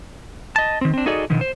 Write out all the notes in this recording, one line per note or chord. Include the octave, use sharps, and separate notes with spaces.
D#5 A5
D#3 C4
C4 D4
D#4 F#4 G#4 A4 D5 D#5
B2 D3 D#3 F3
C5